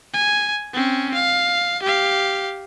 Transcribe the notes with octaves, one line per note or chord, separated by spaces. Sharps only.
G#5
C4 C#4
F5
G4 F5